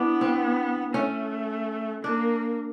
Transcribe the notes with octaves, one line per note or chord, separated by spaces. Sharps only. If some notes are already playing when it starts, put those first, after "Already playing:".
Already playing: B3 D4 E4
C4
A3 C#4
A#3 D4